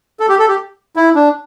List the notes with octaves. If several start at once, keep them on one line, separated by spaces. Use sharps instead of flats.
A4
G4
A4
G4
E4
D4